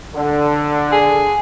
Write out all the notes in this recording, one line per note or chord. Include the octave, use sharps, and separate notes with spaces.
D3
G#4